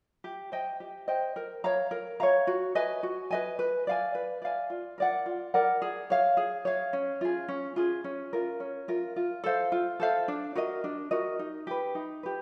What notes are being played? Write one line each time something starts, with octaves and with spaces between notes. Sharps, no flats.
G4
C5 D#5 G5
G4
C5 D#5 G5
A#4
C#5 F5 A#5
A#4
C#5 F5 A#5
F#4
B4 D#5 G#5
F#4
B4 D#5 G#5
B4
D5 F5 G#5
B4
D5 F5 G#5
F4
A#4 D5 F#5
F4
A#4 D5 F#5
G#4
C#5 F5
G#4
C#5 F5
C#4
F4 G#4
C#4
F4 G#4
C#4
F4 A#4
C#4
F4 A#4
F4
A4 C5 F5
F4
A4 C5 F5
D4
F#4 A#4 D#5
D4
F#4 A#4 D#5
D#4
G4 B4
D#4
G4 B4